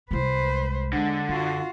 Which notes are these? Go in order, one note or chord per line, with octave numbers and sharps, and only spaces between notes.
C2 G#3 B4 C5
E2 D3 G#3
F#2 F4 F#4